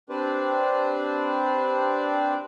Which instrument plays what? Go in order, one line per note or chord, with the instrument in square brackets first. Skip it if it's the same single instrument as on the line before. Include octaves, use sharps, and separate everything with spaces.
[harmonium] C4 D4 G4 B4 C5 D5